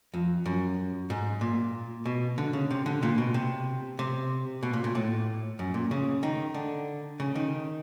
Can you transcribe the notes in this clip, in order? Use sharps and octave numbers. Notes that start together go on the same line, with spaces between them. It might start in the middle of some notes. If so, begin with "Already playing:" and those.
F2
F#2
G#2
A#2
B2
D3
C#3
C3
D3
A#2
B2
C3
C3
B2
A#2
A#2
A2
F#2
A#2
C#3
D#3
D3
C#3
D#3